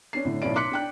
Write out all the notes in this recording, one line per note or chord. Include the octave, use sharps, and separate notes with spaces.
C#4 D4 C7
A2 D3
B1 A2 C#4 E4 D5 D7
C6 D6 F#6 B6 C#7
D4 G5 F#6